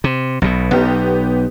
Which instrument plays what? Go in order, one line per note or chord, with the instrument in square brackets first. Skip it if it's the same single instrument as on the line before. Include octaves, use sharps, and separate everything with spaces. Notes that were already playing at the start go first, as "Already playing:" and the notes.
[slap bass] C3
B1 B2
[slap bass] B1 [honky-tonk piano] B3 G4